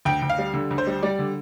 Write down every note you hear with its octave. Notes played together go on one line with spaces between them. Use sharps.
D2 G5
D2
F5
G3
D3
D2
C5
G3
G3 D5
D3